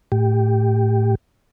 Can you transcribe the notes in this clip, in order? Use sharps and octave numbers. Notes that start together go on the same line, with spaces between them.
A2 G4